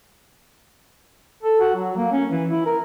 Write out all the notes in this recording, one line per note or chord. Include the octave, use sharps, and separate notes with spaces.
A4
F#4
F#3
A#3
C#4
E3
E4
A#4